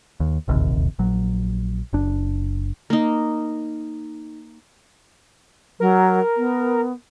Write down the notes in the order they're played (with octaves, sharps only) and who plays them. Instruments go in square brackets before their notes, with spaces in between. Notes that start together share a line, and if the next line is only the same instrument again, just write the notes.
[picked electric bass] D#2
E1 A#1 D#2 C3
A#1 F#3
F#1 D4
[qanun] A#3 D#4
[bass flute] F#3 [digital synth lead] A#4
[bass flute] B3